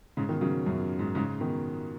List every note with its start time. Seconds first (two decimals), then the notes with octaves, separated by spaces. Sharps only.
0.17 G#2 C#3
0.29 B2 D#3
0.41 C#3 F#3
0.66 F#2 B2
0.99 G#2
1.15 G#2 C#3
1.40 B2 D#3